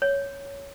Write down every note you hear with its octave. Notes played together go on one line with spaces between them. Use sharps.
C#5